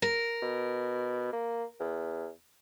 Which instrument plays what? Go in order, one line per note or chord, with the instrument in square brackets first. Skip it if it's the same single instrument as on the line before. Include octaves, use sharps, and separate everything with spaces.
[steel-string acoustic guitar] A#4
[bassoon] B2
A#3
E2